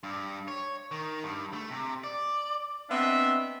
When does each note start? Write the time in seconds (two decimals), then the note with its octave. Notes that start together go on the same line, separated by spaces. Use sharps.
0.03 G2
0.48 C#5
0.91 D#3
1.24 G2
1.53 A3
1.71 C3
2.04 D5
2.90 B3 C4 D4 D#5 E5